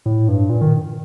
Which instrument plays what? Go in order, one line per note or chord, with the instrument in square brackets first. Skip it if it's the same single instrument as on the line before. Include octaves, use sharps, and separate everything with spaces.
[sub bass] A2
G2
A#2
D#3